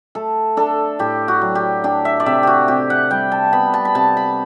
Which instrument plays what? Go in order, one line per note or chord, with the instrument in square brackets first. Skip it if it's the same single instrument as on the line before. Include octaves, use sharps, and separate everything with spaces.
[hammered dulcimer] A3 A4
D4 A4
A2 G4
F#4
F#3
G4
D4 G4
E5
D5
C3 E5
F#4 G4
C3 G4
F#5
G3 G5
A5
B3 B5
A5
B5
C3 A5
B5